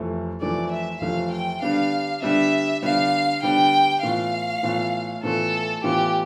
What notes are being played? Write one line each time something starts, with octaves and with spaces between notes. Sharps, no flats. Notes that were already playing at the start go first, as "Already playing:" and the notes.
Already playing: F1 F2 E3 A3
F1 F2 E3 A3 D5
E5
F1 F2 E3 A3 F5
G5
D3 G3 B3 D4 F5
D3 G3 B3 D4 E5
D3 G3 B3 D4 F5
D3 G3 B3 D4 G5
A2 E3 B3 F4 F5
A2 E3 B3 F4
A2 E3 B3 F4 A4
A2 E3 B3 F4 G4